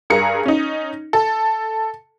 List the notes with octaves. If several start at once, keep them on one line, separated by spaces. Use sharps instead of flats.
G2 G#4 A#4 A#5 C#7
C#4 D#4
A4